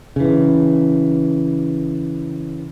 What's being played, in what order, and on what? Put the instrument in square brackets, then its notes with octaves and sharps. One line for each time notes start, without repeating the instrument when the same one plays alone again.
[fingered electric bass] C#3 E3